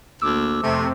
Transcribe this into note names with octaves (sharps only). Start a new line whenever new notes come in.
D2 A#3 D6 E6
F2 C3 A3 C4